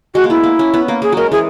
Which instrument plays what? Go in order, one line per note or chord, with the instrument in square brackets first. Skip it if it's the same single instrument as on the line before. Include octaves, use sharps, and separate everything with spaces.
[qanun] G#3 [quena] F#4
[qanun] A#3
[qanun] B3 [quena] E4
[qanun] A#3
C#4
B3
A#3
[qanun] A#3 [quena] G#4
[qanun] F#3 G#3 [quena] A#4
[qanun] E3 [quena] G#4